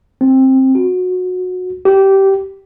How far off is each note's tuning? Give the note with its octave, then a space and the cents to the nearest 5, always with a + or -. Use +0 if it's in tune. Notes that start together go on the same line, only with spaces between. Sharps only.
C4 +15
F#4 -20
G4 -15